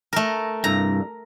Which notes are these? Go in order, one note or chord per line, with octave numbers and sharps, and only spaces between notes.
A3 A#4
C2 G2 A#5